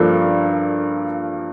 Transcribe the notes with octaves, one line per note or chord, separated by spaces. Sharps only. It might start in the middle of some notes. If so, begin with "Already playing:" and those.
Already playing: G2 F3 A#3 D4 A4